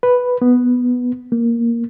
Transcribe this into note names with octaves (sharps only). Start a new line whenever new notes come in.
B4
B3
A#3